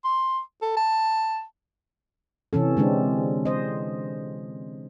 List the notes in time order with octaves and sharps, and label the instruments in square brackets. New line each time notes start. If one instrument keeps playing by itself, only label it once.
[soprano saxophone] C6
A4
A5
[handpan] C3 E3 C#4 A4
D3 G#3 C4 D4
C5 D#5